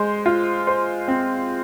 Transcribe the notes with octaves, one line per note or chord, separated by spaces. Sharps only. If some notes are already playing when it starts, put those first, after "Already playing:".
Already playing: G#3 C5
F4
C5
C4